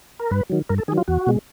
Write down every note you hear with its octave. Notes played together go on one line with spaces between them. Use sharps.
A#4
G2 B4
D#3 F#3
G2 A#4
A4
D#3 F#3 G#4
F4
E2 F#4
B2 G#3